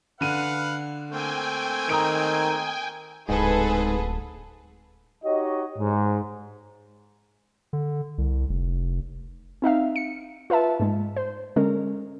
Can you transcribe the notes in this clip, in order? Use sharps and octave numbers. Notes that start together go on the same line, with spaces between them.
D3 B4 F5 F#5 D#7
A3 A#3 C4 G5 G#5
D#3 A#5 D#6 D7
D1 G#2 G#4 A4 B4
D#4 F#4 G4 C#5 D#5
G#2
D3
C2
F1
C4 D#4 E5 F5
C#7
F4 B4 E5 A5
G#2 G#3
C5
D3 G#3 C#4 A#4